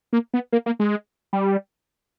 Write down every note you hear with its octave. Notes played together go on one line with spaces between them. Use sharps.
A#3
B3
A#3
A#3
G#3
G3